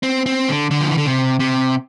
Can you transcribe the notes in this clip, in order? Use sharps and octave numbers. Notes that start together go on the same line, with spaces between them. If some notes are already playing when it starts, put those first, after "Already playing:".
C4
C4
D3
D3
F3
E3
D3
C3
C3